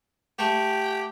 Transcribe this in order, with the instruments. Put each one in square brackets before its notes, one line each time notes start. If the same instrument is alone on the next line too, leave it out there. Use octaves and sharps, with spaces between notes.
[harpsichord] A3 [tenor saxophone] G4